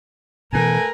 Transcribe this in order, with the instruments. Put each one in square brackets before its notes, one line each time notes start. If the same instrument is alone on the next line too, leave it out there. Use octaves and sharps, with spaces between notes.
[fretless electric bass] B2 D3 E3 [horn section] A3 B4 G#5 [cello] A#4